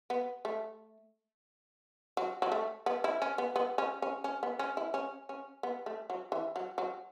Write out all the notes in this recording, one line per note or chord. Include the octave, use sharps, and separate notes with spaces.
B3
A3
F#3
F#3
A3
B3
E4
C#4
B3
B3
C#4
C#4
C#4
B3
C#4
E4
C#4
C#4
B3
A3
F#3
E3
F#3
F#3